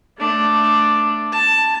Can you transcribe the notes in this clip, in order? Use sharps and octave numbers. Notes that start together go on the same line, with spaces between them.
A3 D4
A5